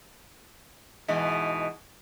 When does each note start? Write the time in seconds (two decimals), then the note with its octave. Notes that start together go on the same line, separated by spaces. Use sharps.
1.08 G#2 B2 E3